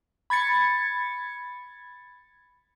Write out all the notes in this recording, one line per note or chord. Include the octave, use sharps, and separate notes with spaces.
B5 G#6 A6 C#7